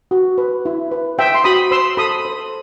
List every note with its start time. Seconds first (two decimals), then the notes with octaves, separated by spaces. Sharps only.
0.11 F#4
0.38 B4
0.66 E4
0.91 B4
1.18 C5 E5 G5
1.34 C6
1.44 F#4 B5 D#6
1.71 C5 C6 E6
1.97 A4 B5 D#6
2.25 C5